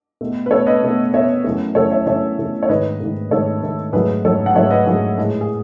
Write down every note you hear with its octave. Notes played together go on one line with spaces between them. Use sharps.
B2 A3
B4
B2 A3 A4 C#5
B4 D#5
B2 A3
B2 A3 C#5 E5
F#2 E3 A3
F#2 E3 A3 A4 C#5
C#5 E5
F#2 E3 A3 C#5 E5
F#2 E3 A3
C#5
G#2 D#3 A3 B4 D#5
G#2 D#3 A3
G#2 D#3 A3 A4 C#5
G#2 D#3 A3
G#2 F#3 A3 G#4 B4
G#2 F#3 A3 A4 C#5
F#5
G#2 F#3 A3 C#5 E5
B4 D#5
G#2 F#3 A3 G#4
A2 G#3
G#4